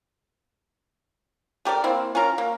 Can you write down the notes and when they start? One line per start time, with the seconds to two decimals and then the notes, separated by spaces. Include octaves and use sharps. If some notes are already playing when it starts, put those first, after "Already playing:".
1.65 A3 G4 A#4 D5
1.84 A#3 C4 E4
2.15 C#4 F4 A#4 A#5
2.38 A#3